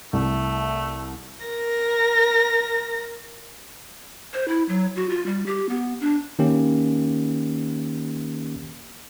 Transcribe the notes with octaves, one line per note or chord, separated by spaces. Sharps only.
C2 A3
A#4 A#6
C5
E4
F#3
F#4
F4
G3
G4
B3
D4
D#3 A#3 C#4 G4